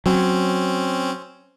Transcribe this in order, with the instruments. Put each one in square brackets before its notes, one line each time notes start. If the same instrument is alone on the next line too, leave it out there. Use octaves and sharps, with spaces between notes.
[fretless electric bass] F#3 [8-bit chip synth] C4 C#4